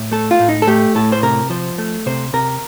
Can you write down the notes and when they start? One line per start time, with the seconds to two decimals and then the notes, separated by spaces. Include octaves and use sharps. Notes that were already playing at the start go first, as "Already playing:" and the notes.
Already playing: A2
0.11 A3 A4
0.31 F4
0.40 A2
0.49 D#4
0.62 A4
0.67 A3 G4
0.95 A2 A4
1.12 C5
1.23 C3 A#4
1.50 F3 C5
1.78 A3
2.06 C3 C5
2.33 C3 A#4